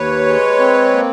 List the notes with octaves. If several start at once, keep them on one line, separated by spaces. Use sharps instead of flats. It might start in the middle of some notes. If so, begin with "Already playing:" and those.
Already playing: D#2 B4 C#5
G#3
C4
A#3